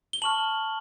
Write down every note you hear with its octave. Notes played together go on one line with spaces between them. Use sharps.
G7
A5 C#6 F6 F#7